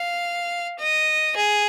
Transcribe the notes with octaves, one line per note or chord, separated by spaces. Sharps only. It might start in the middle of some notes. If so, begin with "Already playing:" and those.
Already playing: F5
D#5
G#4